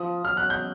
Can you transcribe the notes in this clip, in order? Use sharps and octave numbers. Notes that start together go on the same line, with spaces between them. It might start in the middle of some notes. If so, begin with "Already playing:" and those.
Already playing: F3 D#6
F#3 F6
F#6
G6